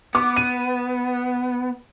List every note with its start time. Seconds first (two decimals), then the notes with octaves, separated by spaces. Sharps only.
0.15 B3 D6
0.36 D#7